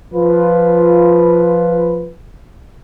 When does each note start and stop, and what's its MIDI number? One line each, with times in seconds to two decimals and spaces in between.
0.14 2.11 53
0.14 2.11 65
0.14 2.11 71